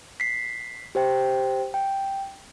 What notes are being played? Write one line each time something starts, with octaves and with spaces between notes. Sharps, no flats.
B6 C7
G4 C5 G5
G5